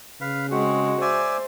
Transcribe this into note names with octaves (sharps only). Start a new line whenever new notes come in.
C#3 B4 F5
G#3 C4 F#4
C5 D5 E5 G#5